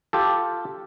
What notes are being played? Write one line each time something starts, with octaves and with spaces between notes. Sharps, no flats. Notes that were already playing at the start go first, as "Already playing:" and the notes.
F4 G4 A4